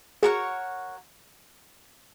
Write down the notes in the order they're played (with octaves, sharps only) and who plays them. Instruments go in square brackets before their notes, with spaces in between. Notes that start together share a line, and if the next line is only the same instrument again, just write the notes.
[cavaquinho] F#4 A#4 C#5 F#5 [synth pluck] G#4